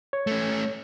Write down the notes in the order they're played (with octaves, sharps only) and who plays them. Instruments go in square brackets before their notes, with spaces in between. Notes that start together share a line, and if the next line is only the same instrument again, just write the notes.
[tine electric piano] C#5
[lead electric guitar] A3 C#4